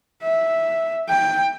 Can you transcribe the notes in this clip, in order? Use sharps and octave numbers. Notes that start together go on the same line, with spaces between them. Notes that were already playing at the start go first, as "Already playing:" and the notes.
E5
G5